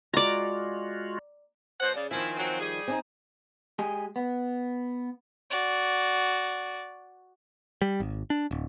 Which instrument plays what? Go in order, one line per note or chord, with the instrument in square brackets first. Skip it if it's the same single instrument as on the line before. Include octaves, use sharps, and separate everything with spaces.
[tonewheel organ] G#3 F4 F#4 [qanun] D5 A#5
[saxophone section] B2 F#3 F#5 [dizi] C5
[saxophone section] C#3 [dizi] D5
[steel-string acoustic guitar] D#3 F3 [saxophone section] C4 E4 [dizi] G#5
[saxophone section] F#3 C4
G3 G#4
[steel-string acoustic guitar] C4 D4 D#4 [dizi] G#5
[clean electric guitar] G#3 G4 G#4
B3
[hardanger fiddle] F#4 D5
[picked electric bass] G3
G#1
D4
D1